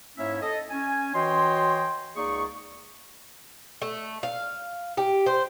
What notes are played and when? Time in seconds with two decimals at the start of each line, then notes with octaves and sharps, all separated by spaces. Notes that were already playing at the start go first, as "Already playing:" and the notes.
0.18 G#2 A#3 C#4 E4 C#5 E5
0.42 A4 D#5
0.71 C#4 G#5
1.15 E3 F#4 C#5 D#5 G5 C6
2.16 C#2 A#3 D#4 G#4 D5 C#6
3.82 A3
4.23 F5
4.97 G4
5.26 C5